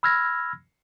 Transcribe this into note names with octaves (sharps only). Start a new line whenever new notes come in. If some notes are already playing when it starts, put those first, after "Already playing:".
B5 E6 F6 G#6 A#6